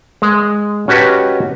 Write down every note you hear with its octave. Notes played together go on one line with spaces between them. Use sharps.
G#3
C#4 F#4 G4 B4 D#5 A5